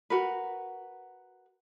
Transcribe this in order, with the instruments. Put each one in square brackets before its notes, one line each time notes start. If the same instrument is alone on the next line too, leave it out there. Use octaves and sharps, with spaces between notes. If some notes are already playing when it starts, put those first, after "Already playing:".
[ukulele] F#4 A#4 B4